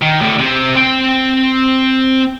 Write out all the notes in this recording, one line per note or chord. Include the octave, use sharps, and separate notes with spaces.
D#3
A2 D3
C3 C4
C4 G5